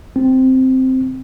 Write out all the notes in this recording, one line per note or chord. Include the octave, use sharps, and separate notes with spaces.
C4